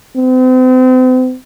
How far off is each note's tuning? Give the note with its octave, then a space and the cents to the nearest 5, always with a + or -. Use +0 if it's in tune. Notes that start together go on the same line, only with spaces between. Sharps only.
C4 -40